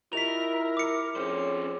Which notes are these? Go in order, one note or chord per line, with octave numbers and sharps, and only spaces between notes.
E4 F4 G4 A#4 D#5 B6 F7
D6 C#7
F2 C#4 G#4 C5 C#5